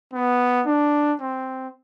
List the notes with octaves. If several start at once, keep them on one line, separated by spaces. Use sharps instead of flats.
B3
D4
C4